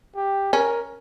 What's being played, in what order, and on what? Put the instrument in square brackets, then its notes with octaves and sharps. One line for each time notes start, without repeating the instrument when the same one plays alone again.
[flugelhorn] G4
[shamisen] C#4 [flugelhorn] A#4